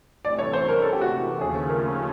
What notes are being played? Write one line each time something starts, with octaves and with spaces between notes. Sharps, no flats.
C3 E3 A3 D5
C#5
C5
A#4
A4
G4
F#4
D#2 C#3 F3 A3 C#4 G#4
A#4